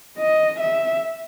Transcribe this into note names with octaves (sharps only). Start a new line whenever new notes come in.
D#5
E5